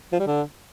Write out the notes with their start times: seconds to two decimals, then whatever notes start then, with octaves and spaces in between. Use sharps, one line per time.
0.13 F3
0.20 G3
0.27 D3